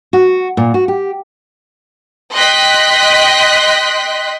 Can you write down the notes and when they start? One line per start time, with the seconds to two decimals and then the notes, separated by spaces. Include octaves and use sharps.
0.13 F#4
0.57 A#2
0.74 F#4
0.88 G4
2.35 D#5 G5 C6 F#6 B6